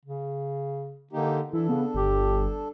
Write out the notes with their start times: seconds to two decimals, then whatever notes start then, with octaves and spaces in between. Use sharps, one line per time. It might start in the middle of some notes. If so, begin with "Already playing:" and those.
0.05 C#3
1.13 D3 A#3 D#4 G4
1.53 E3 D4 E4 A4
1.69 C#3 B3
1.95 G1 G4